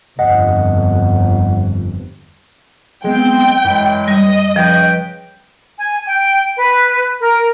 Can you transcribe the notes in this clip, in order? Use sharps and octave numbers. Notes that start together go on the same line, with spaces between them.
G1 F2 D#5 F#5
F#3 G#3 B3 C4 G5
F#2 E3 F#3 G#3
G3 D#5
C#3 F3 B4 G5
G#5
G5
B4
A#4